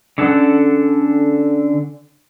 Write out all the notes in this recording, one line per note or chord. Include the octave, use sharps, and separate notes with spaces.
D3 C#4 A4 F#5